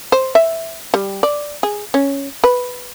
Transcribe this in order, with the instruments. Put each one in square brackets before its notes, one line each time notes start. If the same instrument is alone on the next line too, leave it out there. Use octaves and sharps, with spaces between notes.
[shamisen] C5
E5
G3
D5
G#4
C#4
B4